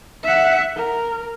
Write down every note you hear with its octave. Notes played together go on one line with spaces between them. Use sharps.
E5 F#5
A#4